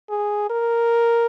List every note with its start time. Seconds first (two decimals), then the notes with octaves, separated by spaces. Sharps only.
0.10 G#4
0.50 A#4